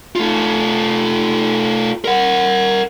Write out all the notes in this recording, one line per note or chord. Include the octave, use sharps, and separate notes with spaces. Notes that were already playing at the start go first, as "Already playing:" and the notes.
A3 F4
A#4 F#5